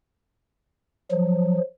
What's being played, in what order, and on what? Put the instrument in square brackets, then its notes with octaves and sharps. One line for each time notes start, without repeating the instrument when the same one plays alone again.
[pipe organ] F3 F#3